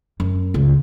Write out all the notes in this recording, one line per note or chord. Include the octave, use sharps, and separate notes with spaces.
F#2
C#2